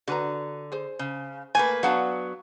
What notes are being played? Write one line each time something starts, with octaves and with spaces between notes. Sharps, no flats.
D3 F#4 B4 A#5
G#4 C5
C#3
A3 A#3 B4 G#5
F#3 B3 D4 F5 F#5 A5